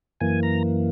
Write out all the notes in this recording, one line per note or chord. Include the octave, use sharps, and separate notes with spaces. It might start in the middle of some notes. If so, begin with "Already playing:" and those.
F#2 E3 A#3 G#5
A#5